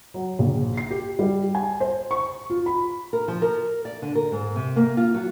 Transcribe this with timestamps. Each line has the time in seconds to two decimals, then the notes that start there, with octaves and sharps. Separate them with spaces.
0.14 F#3
0.39 A#1
0.77 C7
0.91 G4
1.19 G3
1.55 G#5
1.80 C5
2.11 C#6
2.50 F4
2.66 B5
3.13 A#4
3.28 F3
3.42 A#4
3.85 D5
4.02 D3
4.15 A#4
4.32 G#2
4.56 C3
4.76 A#3
4.97 F4
5.14 F#3